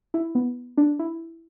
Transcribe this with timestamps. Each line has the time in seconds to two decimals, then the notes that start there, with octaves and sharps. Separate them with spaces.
0.14 E4
0.35 B3
0.77 D4
0.99 E4